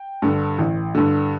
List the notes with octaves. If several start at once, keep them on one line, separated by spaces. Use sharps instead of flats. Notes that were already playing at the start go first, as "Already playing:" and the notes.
Already playing: G5
G2 D3
A1
G2 D3